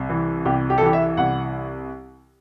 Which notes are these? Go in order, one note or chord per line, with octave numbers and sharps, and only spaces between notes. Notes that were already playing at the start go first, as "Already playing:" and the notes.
Already playing: C2
E3
C2 G4
G4
A4
E3 G4
E5
C2 F#5